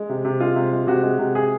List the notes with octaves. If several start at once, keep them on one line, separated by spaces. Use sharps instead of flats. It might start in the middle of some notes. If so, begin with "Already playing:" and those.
Already playing: G#3
C3
C3
G#3 F4
C3
G#3
C3 F#4
G#3
C3
G#4